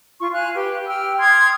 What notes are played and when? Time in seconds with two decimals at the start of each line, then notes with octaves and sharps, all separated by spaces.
0.20 F4 C#6
0.33 F5 G#5 F#6
0.55 G4 B4
0.88 G5 E6 F6
1.19 C6 D#6 F6 G#6